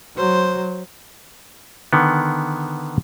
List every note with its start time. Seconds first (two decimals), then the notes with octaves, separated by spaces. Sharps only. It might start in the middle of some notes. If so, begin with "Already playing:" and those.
0.17 F#3 C5
1.93 D3 D#3 B3